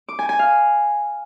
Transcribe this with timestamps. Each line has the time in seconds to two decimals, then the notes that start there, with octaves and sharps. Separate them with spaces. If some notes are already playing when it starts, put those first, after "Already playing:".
0.09 D6
0.19 G#5
0.29 G#5
0.39 F5